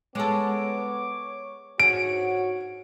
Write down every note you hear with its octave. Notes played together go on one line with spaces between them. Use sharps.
G#3 B3 A4 C#5 D6
G#2 F#4 G#4 C#5 D7